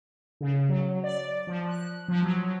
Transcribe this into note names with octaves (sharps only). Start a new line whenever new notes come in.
C#3
F#3
D5
F3
F#6
F3
F#3
F#3